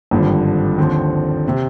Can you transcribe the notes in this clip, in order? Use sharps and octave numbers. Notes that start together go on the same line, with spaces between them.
G#1 G2 D3 F3
D#2 D3 F3 C4
C3